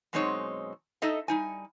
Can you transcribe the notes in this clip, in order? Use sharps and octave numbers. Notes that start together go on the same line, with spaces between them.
F#2 B2 G#3 C4 D#4 C#5
D#4 A4 D#5 E5
G3 D#4 G#5